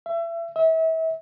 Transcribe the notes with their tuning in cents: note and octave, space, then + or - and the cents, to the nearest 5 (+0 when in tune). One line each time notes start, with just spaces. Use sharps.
E5 +30
E5 -35